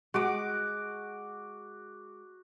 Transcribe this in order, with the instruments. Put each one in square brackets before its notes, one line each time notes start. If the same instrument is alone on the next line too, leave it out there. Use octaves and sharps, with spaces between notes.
[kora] G#3 [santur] F#4 D6